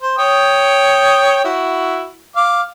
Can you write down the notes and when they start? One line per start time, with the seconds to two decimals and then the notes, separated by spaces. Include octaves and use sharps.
0.02 C5
0.18 C#5 G5 D#6
1.45 E4 F#4
2.36 F5 D6